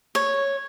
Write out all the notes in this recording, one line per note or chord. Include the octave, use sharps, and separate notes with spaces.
C#5